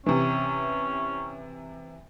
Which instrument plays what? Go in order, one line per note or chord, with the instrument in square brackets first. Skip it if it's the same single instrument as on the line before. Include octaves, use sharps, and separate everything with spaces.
[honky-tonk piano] C3 E3 [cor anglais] C#4